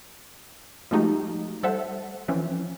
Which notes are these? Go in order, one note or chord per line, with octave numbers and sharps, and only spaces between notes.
F3 G#3 A3 D#4 F#4 G4
G3 A4 C5 E5 F#5
E3 F3 C4 C#4